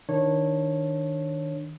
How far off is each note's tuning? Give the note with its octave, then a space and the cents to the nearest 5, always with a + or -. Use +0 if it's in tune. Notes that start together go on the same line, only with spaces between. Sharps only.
D#3 +10 D4 +0 C#5 -20